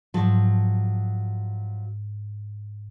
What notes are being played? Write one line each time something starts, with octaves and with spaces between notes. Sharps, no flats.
G#2 F3 F#3 A5